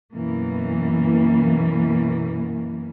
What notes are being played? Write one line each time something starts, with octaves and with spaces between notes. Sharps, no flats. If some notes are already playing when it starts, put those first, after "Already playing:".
F#2 B2 E3 A#3